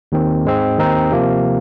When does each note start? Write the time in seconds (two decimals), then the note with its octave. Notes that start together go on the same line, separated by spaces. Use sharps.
0.12 D#2 D#3 C4
0.45 G#2 G#3 C4
0.78 D#2 D#3 C4 D#4
1.11 C3 F3 A#3